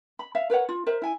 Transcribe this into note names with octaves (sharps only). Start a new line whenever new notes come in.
B5
E5 F5
A#4 B4 C#5 F#5
F4
A#4 C5 E5
E4 G#5